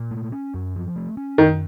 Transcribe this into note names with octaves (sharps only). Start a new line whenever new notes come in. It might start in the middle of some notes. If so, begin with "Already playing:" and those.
Already playing: A#2
A3
C#4
F#2
F3
A3
C#4
F#2 D#3